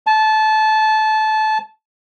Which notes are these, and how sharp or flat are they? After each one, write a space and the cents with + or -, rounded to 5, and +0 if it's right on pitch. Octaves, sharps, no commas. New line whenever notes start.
A5 -20